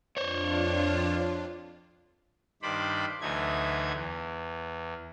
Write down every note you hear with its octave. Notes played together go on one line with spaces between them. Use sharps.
F2 D4 F4 C5 C#5
G2 D#3 C5 D5 B5
D2 E3 F#3 A3 D#4 G#6
E2